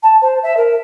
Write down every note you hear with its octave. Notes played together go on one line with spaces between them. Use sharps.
A5
C5
E5
A#4